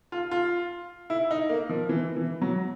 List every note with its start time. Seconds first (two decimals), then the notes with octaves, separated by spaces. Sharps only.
0.12 F4
0.31 F4
1.10 E4
1.31 D#4
1.49 A#3
1.69 F3
1.89 E3
2.16 E3
2.42 F#3